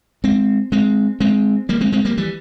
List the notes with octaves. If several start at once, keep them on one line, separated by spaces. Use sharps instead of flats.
G#3 C4
G#3 C4
G#3 C4
G3 A#3
G#3 C4
G#3 C4
G3 A#3
E3 G3